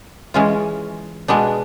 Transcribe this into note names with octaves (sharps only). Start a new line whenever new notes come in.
E3 G#3 C#4 F4
B2 G#3 B3 D4